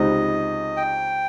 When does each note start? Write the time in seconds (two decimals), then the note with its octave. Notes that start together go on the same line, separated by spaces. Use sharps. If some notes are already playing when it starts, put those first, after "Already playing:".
Already playing: C#2 C3 G3 C4 D#4 D#5
0.77 G5